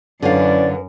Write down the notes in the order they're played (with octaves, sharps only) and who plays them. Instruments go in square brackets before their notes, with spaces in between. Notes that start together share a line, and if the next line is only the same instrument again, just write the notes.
[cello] F#2 [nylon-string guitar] D3 F5 [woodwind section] C#4 E4 D5 [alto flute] B4